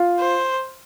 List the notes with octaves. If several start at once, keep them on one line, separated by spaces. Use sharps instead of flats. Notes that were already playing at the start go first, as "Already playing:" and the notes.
Already playing: F4
C5